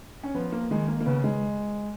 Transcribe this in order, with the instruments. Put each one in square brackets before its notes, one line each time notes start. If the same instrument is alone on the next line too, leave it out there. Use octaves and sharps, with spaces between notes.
[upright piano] C#4
[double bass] F3 [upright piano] B3
[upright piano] A#3
[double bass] D#3 [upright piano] G#3
[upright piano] A#3
A#3
[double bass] C#3 [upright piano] B3
[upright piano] G#3